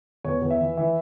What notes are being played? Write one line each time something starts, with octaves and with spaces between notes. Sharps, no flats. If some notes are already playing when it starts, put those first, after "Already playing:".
E2 C#5
E2
E5
E3
E3